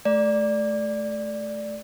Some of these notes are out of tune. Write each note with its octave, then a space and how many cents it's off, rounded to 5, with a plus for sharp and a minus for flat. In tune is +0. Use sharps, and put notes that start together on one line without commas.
A3 -25 D5 +0